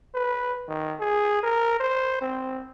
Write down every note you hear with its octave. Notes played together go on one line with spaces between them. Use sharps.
B4
D#3
G#4
A#4
C5
C4